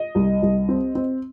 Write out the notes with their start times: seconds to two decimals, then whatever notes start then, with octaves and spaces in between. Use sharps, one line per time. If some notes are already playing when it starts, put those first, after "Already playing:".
Already playing: D#5
0.15 C2
0.42 C2
0.69 C4
0.95 C4